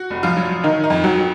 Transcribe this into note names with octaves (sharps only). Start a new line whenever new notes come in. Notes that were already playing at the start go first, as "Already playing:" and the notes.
Already playing: F#4
F1
F3 F4
F#3
D#3 D#4
D#4
F2
F#3 F#4